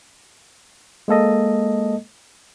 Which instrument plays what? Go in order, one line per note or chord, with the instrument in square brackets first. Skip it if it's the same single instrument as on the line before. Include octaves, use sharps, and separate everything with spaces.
[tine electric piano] G#3 A#3 A4 D#5